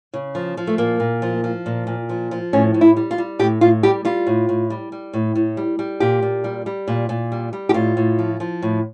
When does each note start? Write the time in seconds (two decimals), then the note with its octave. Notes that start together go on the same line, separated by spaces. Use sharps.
0.14 C#3
0.35 F3
0.57 F3
0.67 A3
0.78 A#2 A#3
1.00 A#2
1.22 F3
1.44 F3
1.66 A#2
1.87 A#2
2.09 F3
2.31 F3
2.53 A2 C#4
2.74 A2
2.81 E4
2.97 G3
3.11 F4
3.18 G3
3.39 A2 G4
3.61 A2 F4
3.83 G3 G4
4.05 G3 F4
4.27 A2
4.49 A2
4.70 G3
4.92 G3
5.13 A2
5.35 A2
5.57 G3
5.79 G3
6.00 A#2 G4
6.22 A#2
6.44 G3
6.66 G3
6.88 A#2
7.09 A#2
7.32 G3
7.53 G3
7.69 G4
7.74 A2 F4
7.97 A2
8.19 F3
8.40 F3
8.62 A2